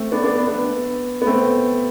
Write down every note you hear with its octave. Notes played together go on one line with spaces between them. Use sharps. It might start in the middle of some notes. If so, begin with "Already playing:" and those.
Already playing: A3 C4
B3 D4
B3 D4
B3
B3
B3
A3 C4